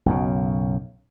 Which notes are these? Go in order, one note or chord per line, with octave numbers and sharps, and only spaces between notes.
B1 F#2 C#3